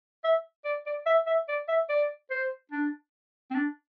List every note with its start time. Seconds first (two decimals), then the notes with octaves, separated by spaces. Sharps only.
0.24 E5
0.65 D5
0.87 D5
1.06 E5
1.27 E5
1.49 D5
1.69 E5
1.89 D5
2.31 C5
2.72 D4
3.51 C4
3.55 D4